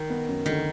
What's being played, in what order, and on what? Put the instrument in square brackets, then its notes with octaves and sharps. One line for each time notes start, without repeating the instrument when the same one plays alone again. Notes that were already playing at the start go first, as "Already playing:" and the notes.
Already playing: [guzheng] D#3
[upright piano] B3
F#2
[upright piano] D2 [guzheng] D#3